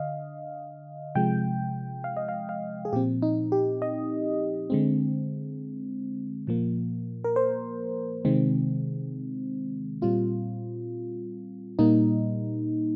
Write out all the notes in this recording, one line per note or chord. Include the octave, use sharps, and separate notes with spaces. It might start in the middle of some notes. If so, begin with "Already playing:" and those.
Already playing: D3 D#5 F5
C3 F3 G#3 G5
F5
D#5
F5
F5
G#4
A#2 F3 C4 G4
D#4
G4
D#5
D3 G#3 C4
A#2 F3 A#3
A#4
C5
C3 D#3 G#3 C4
A#2 G3 C4 F4
A#2 G3 A#3 D#4